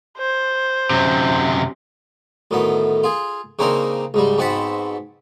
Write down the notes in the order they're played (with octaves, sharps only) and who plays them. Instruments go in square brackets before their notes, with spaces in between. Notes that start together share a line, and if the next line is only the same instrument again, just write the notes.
[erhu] C5
[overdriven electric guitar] F#2 C3
[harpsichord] D2 A2 D#3 B3
F4 G#4
C#3 A#3 C4 D4 D#4 A#4
C#2 G#2 G3
G#2 B2 C4 F#5 A5 B5